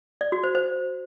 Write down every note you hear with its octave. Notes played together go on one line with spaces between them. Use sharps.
D5
F#4
C5
C5